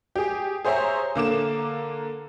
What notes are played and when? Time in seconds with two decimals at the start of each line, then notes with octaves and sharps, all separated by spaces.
0.15 G4 G#4
0.65 G#4 C5 C#5 E5 A#5
1.15 D3 A#3 D6 E7